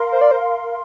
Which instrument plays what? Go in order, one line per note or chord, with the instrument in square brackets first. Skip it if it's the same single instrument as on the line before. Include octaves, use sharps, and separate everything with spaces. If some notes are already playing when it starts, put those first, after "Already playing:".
Already playing: [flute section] A#4 F5 C6
[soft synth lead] C5
D5
C5